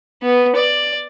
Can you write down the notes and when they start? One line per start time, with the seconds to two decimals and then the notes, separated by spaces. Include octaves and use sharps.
0.23 B3
0.56 D5